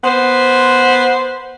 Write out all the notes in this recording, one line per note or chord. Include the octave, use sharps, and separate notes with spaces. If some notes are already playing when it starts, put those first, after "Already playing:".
B3 C5